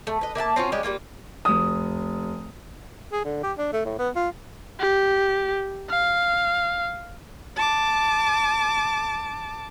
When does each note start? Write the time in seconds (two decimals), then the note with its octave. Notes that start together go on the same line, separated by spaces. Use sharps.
0.07 A3
0.21 B4 D#5
0.35 A#3 E5 F#5 A5
0.56 C4 C#4 F4 F#4
0.72 G3 G#3 C#4 G4
0.83 G3 G#3 A#3 F4
1.45 F1 D#6
3.12 G#4
3.24 D3
3.43 G4
3.58 D4
3.73 A3
3.85 A2
3.99 B3
4.16 F4
4.80 G4
5.90 F5
7.57 A5 D6